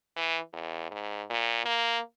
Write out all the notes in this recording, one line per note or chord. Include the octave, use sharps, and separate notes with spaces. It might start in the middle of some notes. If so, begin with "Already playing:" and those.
E3
E2
G#2
A#2
A#3